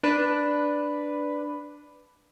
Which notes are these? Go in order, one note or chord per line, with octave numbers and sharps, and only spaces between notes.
D4 B4